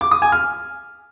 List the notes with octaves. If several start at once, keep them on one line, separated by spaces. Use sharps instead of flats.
D6
D#6
G#5
F6